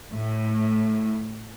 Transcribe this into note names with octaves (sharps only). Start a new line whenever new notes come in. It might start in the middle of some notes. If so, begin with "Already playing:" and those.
A2